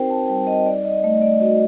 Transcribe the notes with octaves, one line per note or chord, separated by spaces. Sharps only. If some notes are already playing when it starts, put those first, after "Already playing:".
Already playing: C4 D#4 F#4 A#4 C5 G5
A5
G3 G5
D#5
D#4 D5
D#5
A3 D#5
D5
F#4 D#5